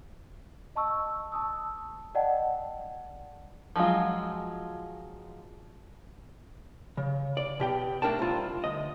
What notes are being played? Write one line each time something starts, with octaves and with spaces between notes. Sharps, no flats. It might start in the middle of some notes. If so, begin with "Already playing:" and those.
D#5 A5 C#6 E6
A5 D#6 E6
D5 D#5 F#5 G5 A5
F3 F#3 G#3 F4
C#3
D5
B2 G4 G5
A3 D4 A#4 G5 A5
C2 F4
D2 D#5